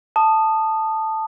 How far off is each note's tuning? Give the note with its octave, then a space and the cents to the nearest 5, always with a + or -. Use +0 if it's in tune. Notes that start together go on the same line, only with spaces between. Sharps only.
A5 +0 D#6 -15